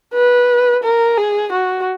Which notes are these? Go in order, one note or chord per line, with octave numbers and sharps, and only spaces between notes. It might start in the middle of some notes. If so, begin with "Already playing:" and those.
B4
A#4
G#4
F#4